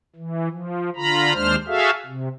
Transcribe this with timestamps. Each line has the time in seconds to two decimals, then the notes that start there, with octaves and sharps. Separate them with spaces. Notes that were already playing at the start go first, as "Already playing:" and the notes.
0.16 E3
0.50 F3
0.96 D3 F4 A#5 B5
1.33 D#2 G#3 D4 C5 F6
1.68 F#4 G#4 A4 E5 F5
2.06 C3